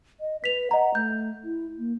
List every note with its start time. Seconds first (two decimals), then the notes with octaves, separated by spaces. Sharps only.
0.21 D#5
0.44 B4 B6 F7
0.71 D#5 F#5 A#5
0.95 A3 G6
1.44 E4
1.79 A#3